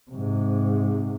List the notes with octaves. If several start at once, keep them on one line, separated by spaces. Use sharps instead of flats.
G#2 C3